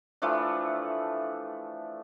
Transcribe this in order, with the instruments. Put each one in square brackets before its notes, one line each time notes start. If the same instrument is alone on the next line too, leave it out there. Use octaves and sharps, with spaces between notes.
[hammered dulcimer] E3 F3 A3 D4